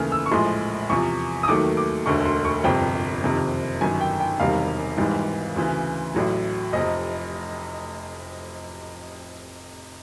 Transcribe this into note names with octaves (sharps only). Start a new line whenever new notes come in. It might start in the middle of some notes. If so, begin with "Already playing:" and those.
Already playing: D#2 C#3 E3 A3 F6
E6
C#6
A#1 A2 F3 G#3 C6
E2 C3 F3 C#6
D#6
D#2 D#3 F#3 A3 D6
D6
E1 D2 D3 C#6
C6
C#6
G1 F2 C3 G5
F#1 F2 C3 D#3
G1 F#2 D#3 G#5
G5
G5
E1 E2 C3 D#3 G3 F5
G#1 G#2 E3 G3
D2 C#3 E3
A1 A2 F#3
F1 F2 C3 D#5